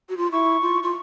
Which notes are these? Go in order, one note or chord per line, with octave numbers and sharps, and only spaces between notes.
F#4
F4
E4 C#6
F4
F4